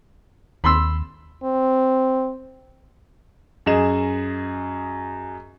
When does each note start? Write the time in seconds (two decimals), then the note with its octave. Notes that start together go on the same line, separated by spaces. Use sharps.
0.64 D#2 B5 C6 E6
1.44 C4
3.66 F#2 G#4 D#5 E7